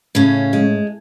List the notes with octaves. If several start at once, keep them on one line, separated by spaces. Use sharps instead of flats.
A2 C#3 C#4
G#3